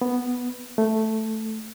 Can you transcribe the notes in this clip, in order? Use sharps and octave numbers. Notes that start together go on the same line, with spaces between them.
B3
A3